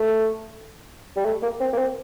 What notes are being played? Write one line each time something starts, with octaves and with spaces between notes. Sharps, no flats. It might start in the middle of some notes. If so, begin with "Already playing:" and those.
Already playing: A3
G3
A3
A#3
C4
A#3
C4